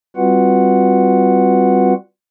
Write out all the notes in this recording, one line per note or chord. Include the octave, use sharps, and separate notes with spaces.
G3 C4 F4 F#4 B4 F#5